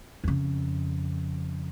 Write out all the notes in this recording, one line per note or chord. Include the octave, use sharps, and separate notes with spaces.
F2 C#3